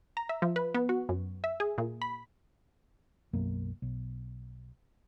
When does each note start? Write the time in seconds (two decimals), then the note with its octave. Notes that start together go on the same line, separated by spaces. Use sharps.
0.17 A#5
0.29 E5
0.42 F3
0.56 B4
0.74 B3
0.89 F#4
1.09 F#2
1.44 E5
1.60 G#4
1.78 A#2
2.02 B5
3.33 B1 F#2 F#3 A#3
3.82 B1